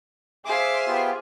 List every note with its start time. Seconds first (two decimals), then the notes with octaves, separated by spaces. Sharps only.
0.45 G#4 C5 E5 F5 D6
0.87 B3 F4 G4